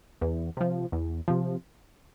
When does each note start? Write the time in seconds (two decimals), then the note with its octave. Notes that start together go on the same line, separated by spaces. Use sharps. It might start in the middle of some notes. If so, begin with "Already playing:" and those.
0.21 E2
0.57 C3 F3
0.92 E2
1.28 C3 F3